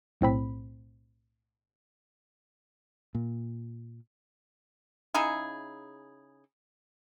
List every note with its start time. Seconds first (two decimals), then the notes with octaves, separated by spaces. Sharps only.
0.21 B1 A2 C4 B5
3.15 A#2
5.14 C#3 D#4 E4 G#4